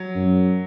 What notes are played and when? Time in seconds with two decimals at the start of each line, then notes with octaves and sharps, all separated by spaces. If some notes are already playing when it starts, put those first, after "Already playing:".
Already playing: F#3
0.15 F#2